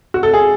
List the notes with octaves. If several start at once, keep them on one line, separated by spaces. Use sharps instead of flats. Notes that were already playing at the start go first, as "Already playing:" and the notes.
F#4
A4
G#4